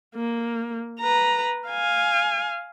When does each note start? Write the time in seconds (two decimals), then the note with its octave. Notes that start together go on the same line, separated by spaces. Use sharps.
0.15 A#3
1.00 B4 A#5
1.68 F5 G#5